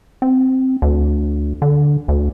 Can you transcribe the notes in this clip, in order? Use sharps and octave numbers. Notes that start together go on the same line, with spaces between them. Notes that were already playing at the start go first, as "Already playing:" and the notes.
C4
D2
D3
D2